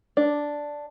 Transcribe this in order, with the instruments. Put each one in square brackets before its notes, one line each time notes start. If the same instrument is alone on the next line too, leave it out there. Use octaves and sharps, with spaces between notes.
[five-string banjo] D4